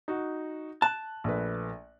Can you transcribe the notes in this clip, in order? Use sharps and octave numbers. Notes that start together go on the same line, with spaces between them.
D#4 F#4
A5 F#6
A#1 A3 B4